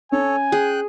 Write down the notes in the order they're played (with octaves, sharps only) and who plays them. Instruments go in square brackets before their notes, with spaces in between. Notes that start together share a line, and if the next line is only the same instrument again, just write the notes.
[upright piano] C#4 [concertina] A4 C#5 [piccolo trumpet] G#5
[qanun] G#4 [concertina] G5 F#6